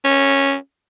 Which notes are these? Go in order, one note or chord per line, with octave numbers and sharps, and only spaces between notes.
C#4